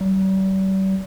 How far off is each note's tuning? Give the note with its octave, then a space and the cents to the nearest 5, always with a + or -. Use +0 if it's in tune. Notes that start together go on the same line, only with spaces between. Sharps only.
G3 -40